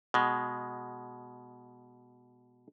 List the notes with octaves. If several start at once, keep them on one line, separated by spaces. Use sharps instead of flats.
B2 G#3